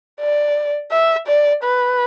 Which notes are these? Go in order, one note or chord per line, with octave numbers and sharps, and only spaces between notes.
D5
E5
D5
B4